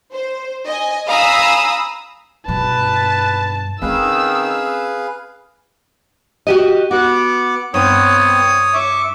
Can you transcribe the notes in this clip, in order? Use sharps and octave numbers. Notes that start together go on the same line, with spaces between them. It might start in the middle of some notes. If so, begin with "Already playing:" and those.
C5
D#5 G#5
F5 G#5 A#5 B5 D#6 E6
G2 B2 B4 A5
D#3 C4 C#4 G#4 B4 F5 E6
F#4 G4 D#5
B3 F#4 F#5 D6
G2 B3 C4 C#5 D#6
E5 C#6 D6